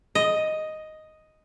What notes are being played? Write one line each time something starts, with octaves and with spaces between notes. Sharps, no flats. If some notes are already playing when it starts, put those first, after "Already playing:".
D#5